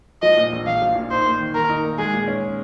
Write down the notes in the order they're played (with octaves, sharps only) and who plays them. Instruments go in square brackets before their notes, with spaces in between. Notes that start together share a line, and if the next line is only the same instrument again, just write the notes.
[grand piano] F3 [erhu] D#5
[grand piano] A#2
A#1
[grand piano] A#1 [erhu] F5
[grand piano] F3
A#2
[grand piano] D#4 [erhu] C5
[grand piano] A#3
D#3
[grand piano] D#3 [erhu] A#4
[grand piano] D#4
A#3
[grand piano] G#3 [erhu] G#4
[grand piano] A#2
C#4